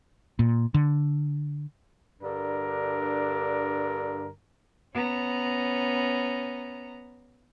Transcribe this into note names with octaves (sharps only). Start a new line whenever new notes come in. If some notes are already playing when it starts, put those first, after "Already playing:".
A#2
D3
G2 D3 D4 A#4
B3 C#4 A#5